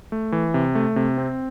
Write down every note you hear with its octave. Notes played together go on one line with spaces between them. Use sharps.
A3
E3
C3
A3
C3
C4